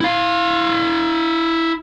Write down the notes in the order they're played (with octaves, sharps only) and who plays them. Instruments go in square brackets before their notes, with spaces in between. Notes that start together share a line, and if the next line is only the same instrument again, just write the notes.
[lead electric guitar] E4 F5